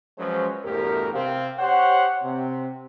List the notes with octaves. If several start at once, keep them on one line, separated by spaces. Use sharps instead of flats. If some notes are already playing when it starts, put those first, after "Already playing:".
F3 F#3 G#3 C#4 B4 C5
E2 G2 B2 A3 G4 A#4
C3 C4 F5
G4 C5 C#5 F#5
C3 C4